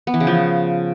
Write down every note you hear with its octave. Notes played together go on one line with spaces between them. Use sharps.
B3
E3
C#3
F3